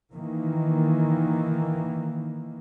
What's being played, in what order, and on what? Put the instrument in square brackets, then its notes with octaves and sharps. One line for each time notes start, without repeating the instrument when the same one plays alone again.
[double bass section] D#3 E3 A#3